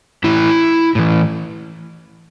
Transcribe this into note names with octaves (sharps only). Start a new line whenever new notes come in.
A2 E3 E4
A2 E3